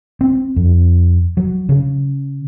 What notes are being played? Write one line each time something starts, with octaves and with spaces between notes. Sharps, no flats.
C4
F2
F#3
C#3